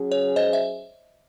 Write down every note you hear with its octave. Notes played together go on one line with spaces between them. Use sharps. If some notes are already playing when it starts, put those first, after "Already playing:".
Already playing: F#3 C#4 G#4
C#5
C5 D#5
E5